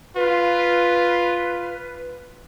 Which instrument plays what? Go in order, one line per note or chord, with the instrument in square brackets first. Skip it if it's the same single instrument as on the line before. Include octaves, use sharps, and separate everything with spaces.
[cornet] F4 [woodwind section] B4